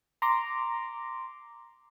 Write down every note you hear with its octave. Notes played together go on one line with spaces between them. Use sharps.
A#5 C6 D6